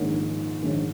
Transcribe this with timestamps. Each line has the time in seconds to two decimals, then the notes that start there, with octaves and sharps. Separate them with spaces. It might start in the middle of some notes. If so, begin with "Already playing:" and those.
Already playing: A#1 G#2 D#3 A#3 C#4
0.63 A#1 G#2 D#3 A#3 C#4